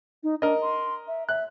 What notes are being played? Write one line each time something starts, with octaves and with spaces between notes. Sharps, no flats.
D#4
D4 A#4 D#5
C6
E5
E5 F#6